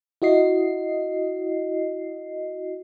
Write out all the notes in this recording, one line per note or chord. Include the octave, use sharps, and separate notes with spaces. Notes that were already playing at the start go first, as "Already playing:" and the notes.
E4 F#4 D#5 C7